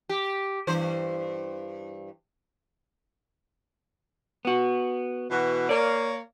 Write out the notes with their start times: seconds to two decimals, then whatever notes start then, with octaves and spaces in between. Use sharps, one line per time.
0.09 G4
0.67 G2 E3 C5
4.45 B3 F#4
5.29 B2 E3 F#4
5.69 A#3 C#5 D5